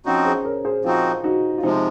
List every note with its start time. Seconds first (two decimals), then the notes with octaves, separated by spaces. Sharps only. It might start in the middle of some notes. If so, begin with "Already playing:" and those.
0.05 F3 C4 C#4 D#4 F#4
0.25 G#4 C5
0.45 A#4 C#5
0.65 G#4 C5
0.84 F3 C4 D#4 F4 F#4 G#4
1.24 D#4 F#4
1.58 F4
1.63 C3 F3 G#3 C4 D#4